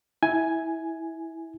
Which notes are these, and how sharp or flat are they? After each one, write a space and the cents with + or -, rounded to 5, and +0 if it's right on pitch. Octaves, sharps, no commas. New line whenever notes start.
E4 -15 G#5 +5